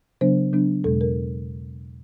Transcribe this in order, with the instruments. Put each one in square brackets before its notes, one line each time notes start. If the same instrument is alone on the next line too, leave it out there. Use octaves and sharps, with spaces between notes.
[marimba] C#3 F#3 B3 D4 C5
C#3 F#3 B3 D4
E2 B2 G#3 A4
A#4